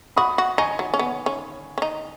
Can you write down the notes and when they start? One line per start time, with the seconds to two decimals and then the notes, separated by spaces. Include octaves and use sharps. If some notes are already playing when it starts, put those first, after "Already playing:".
0.16 F#4 B5 D#6
0.38 F#4
0.58 D#4 G#5 C#6
0.79 F#3
0.94 C#4
0.99 B3
1.26 C#4
1.78 C#4
1.82 D#4